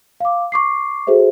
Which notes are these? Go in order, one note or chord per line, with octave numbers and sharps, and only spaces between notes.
F5 D6
C#6 D6 C7
F#4 G#4 A4 C5 E5